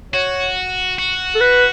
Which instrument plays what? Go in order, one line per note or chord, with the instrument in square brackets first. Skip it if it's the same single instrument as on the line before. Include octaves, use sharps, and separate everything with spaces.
[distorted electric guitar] F#4 [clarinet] C#5
[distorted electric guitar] F#4
[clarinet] A4
B4